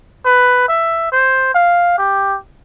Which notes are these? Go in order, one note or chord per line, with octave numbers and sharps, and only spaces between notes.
B4
E5
C5
F5
G4